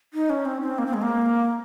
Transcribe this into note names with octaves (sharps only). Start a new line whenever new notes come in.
D#4
C#4
C4
C4
A#3
C4
G#3
A#3